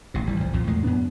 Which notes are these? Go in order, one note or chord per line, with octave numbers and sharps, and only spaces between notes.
A1 C3
G#1 E3 G3
C2 A2 F3
C2 F2 A#2 F3
E2 A2 D3 G#3
F#2 F#3 B3 D4